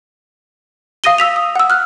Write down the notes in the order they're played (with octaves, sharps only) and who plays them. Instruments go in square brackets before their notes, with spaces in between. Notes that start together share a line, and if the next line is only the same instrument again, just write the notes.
[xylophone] F5 D#6 A#6 D#7 G7
E6 B6 F7
D#6
F#5 E6
F6 F#6